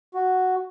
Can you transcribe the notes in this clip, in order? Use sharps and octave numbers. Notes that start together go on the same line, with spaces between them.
F#4